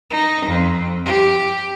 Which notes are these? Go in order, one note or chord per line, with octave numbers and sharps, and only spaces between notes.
D#4
F2
G4